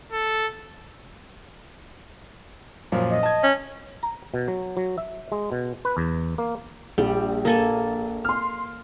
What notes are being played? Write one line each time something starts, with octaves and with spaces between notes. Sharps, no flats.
A4
F#2 A#2 F3
D#5
A5 G#6
C#4
A#5
B2
F#3
F#3
E5
G#3
B2
B4
E2
A#3
A#1 G3
A#3 A4 G#5
C6 F6